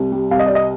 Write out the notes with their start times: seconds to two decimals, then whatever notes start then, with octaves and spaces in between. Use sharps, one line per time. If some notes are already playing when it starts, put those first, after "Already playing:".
Already playing: C2
0.12 G3
0.31 C2 F5
0.39 D#5
0.46 D5
0.51 C3 D#5